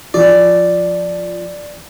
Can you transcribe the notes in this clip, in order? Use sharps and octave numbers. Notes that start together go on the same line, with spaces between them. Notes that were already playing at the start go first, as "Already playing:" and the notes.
F3 D5